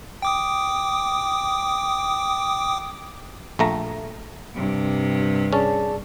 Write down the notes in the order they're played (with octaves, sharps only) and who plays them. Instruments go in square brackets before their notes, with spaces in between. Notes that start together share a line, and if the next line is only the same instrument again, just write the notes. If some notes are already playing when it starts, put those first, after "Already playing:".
[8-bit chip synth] G5 D6 D#6
[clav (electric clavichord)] A#1 A3 A#5
[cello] G2 C3
[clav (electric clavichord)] C#4 [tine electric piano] G#4 D5 A5